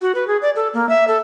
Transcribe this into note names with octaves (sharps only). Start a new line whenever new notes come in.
F#4
B4
G#4
D5
A4
A#3
E5
A4